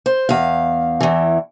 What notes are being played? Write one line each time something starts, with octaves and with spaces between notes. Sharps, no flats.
C5
E2 F5
E2 E3